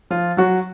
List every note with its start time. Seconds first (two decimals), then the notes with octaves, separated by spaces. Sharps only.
0.11 F3 F4
0.37 F#3 F#4